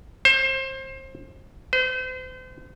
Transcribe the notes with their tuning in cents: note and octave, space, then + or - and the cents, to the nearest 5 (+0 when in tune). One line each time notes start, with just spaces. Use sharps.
C5 +30
C5 -35